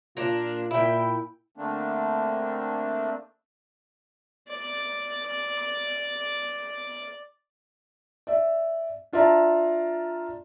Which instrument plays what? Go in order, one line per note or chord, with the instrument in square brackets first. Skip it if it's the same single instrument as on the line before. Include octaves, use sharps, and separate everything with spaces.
[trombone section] A#2 F4 [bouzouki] A#3 D4
[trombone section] A#2 [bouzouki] E4 G5
[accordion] D3 A3 A#3 C4 D4
[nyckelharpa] D5 D6
[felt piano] D5 E5
D4 F4 D5 E5 A5 A#5